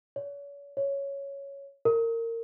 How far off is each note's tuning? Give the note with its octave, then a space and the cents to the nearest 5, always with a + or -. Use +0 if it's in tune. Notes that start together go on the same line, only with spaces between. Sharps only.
C#5 +40
C#5 +5
A#4 -25